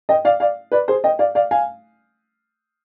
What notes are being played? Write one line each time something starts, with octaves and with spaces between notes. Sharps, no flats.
D#5 G5
D5 F5
D5 F5
B4 D5
G#4 C5
D#5 G5
D5 F5
D5 F5
F5 G#5